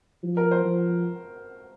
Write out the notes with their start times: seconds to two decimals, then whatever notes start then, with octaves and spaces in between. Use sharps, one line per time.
0.23 F3
0.37 A#4
0.51 C5
0.65 F3